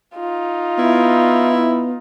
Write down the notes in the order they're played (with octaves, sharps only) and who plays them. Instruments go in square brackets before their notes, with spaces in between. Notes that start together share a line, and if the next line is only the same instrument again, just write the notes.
[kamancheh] D#4 F4
[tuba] B3 [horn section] E4